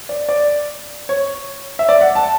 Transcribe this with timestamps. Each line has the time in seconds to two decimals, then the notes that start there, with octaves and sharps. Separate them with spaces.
0.09 D5
0.29 D5
1.09 C#5
1.79 E5
1.89 D5
2.01 F#5
2.15 A5